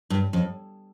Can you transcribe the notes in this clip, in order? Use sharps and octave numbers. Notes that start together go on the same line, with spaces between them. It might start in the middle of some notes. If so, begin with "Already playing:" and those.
G2
F2